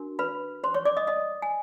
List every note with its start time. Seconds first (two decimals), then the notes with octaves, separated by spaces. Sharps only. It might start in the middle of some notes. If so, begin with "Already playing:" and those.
Already playing: D4 F#4 A#4
0.19 B4 B5
0.64 C5 C6
0.74 C#5 C#6
0.85 D5 D6
0.97 D#5 D#6
1.07 D#5 D#6
1.42 G#5